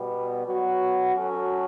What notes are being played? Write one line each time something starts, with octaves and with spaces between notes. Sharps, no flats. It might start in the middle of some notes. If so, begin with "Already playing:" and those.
Already playing: B2 G3 B3
F#3 B3 F#4
F#3 C#4 F#4 A4